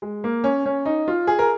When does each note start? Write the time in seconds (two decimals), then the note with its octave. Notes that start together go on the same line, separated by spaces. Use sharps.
0.02 G#3
0.24 A#3
0.44 C#4
0.66 C#4
0.86 D#4
1.08 F4
1.27 G#4
1.39 A#4